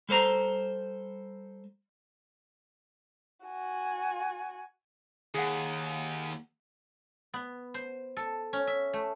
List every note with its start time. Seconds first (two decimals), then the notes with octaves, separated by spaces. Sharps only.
0.09 G3 A4 C5 A#5
3.46 F#4 G#5
5.34 D#2 G#4 F#5
7.34 B3
7.74 C5
8.17 A4
8.53 C#4
8.67 E5
8.93 A3